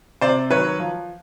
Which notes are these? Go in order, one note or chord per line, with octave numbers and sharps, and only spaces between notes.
C3 C5 D5
D#3 F#3 B4 C#5
F3